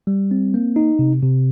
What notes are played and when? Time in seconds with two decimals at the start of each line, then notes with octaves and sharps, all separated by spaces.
0.07 G3
0.31 C4
0.54 A#3
0.76 D#4
0.99 C3
1.23 C3